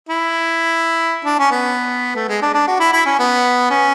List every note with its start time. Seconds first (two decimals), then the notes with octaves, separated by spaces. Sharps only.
0.09 E4
1.25 D4
1.39 C#4
1.51 B3
2.16 A3
2.29 G#3
2.42 D4
2.54 D4
2.67 F#4
2.80 E4
2.93 E4
3.06 C#4
3.19 B3
3.70 C#4